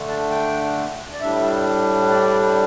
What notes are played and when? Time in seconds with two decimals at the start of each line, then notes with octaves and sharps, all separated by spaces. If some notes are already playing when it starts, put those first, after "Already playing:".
Already playing: D3 A3 D4
0.08 A5
0.31 G5
1.13 D5
1.21 A2 G3 D4 E5
2.11 D5